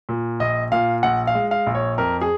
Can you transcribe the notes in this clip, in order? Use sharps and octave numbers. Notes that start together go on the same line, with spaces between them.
A#2
A#1 D#5
A#2 F5
A#1 F#5
F5
G#3
F5
A#1
C#5
F2 A#4
G#4